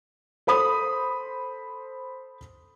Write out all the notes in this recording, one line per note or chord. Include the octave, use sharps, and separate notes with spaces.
A4 C5 B5 D#6